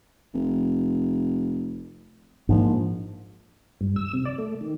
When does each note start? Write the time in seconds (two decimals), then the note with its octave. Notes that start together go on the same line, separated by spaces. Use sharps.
0.34 F1
2.49 A#1 G#2 F3
3.81 G2
3.96 E6
4.14 C3
4.25 D5
4.38 A3
4.61 D#3